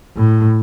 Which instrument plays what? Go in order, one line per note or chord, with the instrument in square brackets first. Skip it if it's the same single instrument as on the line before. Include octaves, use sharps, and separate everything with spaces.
[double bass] A2